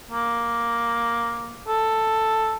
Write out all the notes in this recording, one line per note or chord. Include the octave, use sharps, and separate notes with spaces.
A#3
A4